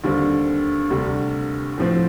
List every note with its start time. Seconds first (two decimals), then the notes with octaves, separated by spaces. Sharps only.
0.04 D#2 D3 G3 C4
0.90 D2 C3 G3
1.78 A2 F3 C4